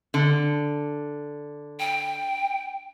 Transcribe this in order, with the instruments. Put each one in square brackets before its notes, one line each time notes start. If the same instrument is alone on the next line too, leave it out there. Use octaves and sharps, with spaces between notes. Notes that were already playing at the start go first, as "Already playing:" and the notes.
[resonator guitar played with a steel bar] D3
[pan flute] G5